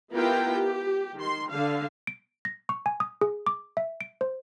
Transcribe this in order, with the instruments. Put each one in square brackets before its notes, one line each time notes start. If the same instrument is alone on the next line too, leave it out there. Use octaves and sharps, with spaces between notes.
[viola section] B3 E4 F4 G4 A#4 G5
G4
D#3 C6
D3 F5
[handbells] D7
A#6
C#6
G#5
D#6
G#4
D6
E5
D7
C5